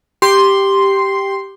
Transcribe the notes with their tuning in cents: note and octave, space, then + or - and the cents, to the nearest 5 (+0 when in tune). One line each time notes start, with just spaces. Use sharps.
G4 +0 C6 +0